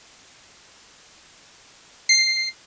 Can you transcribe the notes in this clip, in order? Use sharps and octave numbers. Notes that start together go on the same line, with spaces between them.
C7